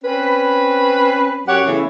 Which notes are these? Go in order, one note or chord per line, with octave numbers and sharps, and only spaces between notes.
C4 C#4 B4
F#2 G4 C#5 F#5
C#3 E3 A3 B3 C#5